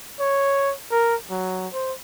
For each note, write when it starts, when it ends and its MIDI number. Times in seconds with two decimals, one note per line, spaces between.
0.20 0.73 73
0.91 1.15 70
1.30 1.67 54
1.73 1.93 72